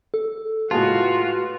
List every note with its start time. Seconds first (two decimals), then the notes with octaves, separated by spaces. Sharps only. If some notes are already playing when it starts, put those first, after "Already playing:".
0.14 A4
0.71 A2 G#3 F4 F#4 B4 A5